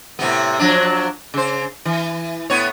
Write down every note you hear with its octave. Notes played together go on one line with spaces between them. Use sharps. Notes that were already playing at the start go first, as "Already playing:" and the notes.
A2 C3 B3
F3 F#3 D4
C#3 C5
E3
A2 B3 C#5